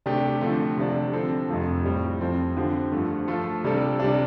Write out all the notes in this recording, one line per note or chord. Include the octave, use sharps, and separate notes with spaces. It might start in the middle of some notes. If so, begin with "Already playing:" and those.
C3 A3 D4 G4
D3 F3 A3 C4
C3 F3 D4
D3 F3 C4 A4
F2 C3 F3 A3
A2 G3 C4
F2 F3 C4 A4
D3 F3 C4 G4
G2 F3 A3
F3 A3 F4 A4
C3 G3 D4 A4
C3 G3 D4